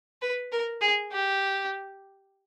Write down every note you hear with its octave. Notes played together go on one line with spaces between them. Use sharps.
B4
A#4
G#4
G4